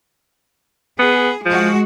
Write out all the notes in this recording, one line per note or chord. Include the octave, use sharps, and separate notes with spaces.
B3 G#4
F3 G#3 F#4